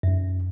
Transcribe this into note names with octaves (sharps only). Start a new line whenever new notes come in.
F#2